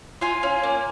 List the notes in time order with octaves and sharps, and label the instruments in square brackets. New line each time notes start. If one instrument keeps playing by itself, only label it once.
[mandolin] F4 G#5
C#4
A#3